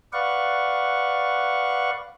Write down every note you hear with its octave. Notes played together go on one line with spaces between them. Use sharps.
B4 D5 F5 F#5 C#6